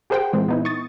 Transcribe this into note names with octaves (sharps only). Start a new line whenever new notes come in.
G4 G#4 A#4 C5 F#5 G5
A#2 E3 G#3 C4
B3 D#4 E4
C#6 D#6 A6